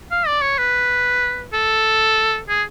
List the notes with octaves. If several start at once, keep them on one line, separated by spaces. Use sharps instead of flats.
F5
D5
C#5
B4
A4
G#4